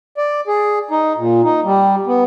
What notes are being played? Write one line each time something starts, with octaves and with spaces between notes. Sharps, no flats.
D5
G#4
D#4
A#2
D#4
G3
B3